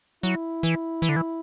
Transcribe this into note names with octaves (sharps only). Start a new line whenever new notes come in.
F#3 E4
E3
E3
D3
E3